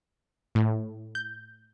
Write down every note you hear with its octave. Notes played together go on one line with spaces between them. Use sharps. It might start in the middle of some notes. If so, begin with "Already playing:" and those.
A2
G6